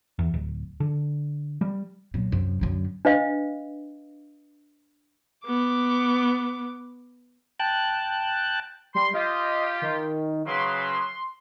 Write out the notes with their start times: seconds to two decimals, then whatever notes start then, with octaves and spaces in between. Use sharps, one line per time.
0.19 E2
0.34 D1
0.80 D3
1.61 G3
2.14 A#2 F#3
2.32 F#2 C3
2.61 F#2 D3
3.05 D4 B4 D#5 F5
5.46 B3 D6
7.60 G5 A5 F#6
8.95 G3 C6
9.14 F4 G4 D#5
9.82 D#3
10.47 C#3 F#3 B4 C6